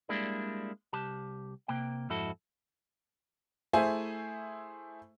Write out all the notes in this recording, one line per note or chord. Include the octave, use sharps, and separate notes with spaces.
G3 G#3 A#3 D4 E4
C2 G4 A5
C3 A#3 G5
F2 G#2 E4 F#4 A4
A3 E4 G#4 C5 G#5